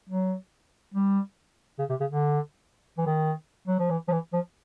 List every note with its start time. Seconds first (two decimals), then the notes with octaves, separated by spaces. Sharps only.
0.09 F#3
0.94 G3
1.79 C#3
1.90 C3
2.00 C#3
2.11 D3
2.98 E3
3.06 D#3
3.68 F#3
3.79 F3
3.90 E3
4.08 F3
4.12 E3
4.33 F3